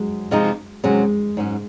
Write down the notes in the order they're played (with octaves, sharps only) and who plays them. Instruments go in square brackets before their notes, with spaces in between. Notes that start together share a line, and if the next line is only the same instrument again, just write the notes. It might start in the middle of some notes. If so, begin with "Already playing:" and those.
Already playing: [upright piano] F#3 G#3
[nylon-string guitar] C3 F3 G#3 D#4
[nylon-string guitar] C3 F#3 C#4 F#4 [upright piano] G#3
[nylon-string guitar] G#2 F#3 C#4